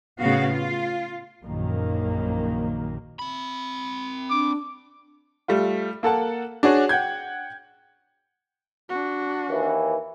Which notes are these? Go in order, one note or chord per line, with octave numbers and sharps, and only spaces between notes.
A2 C#3 B3 F#4 F5
F4
A#1 F#2 D#3 A#3
C4 B5
D4 D6
G3 A3 F4
A#3 A4 F#5 A5
D4 F#4 G#4 C#5
F#5 G5 G6 G#6
D4 F#4
D#2 E3